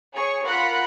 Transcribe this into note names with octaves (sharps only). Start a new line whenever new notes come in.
G#4 C#5 C#6
F4 A#4 F#5 B5 F#6 C#7